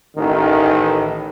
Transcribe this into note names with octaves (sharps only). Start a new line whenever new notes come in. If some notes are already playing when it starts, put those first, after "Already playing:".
A1 D#3